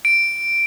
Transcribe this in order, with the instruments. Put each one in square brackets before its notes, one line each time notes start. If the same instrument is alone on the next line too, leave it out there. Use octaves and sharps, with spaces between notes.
[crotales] D7